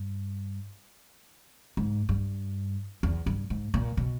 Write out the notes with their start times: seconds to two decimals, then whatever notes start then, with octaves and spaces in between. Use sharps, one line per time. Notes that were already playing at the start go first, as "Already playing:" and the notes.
Already playing: G2
1.77 G#2
2.09 G2
3.03 E2
3.26 G2
3.50 G#2
3.74 A#2
3.97 B2